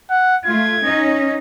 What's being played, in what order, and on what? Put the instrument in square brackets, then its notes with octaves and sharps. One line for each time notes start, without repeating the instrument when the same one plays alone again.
[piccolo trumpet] F#5
[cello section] A3 F4 [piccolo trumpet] G#6
[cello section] C#4 D#4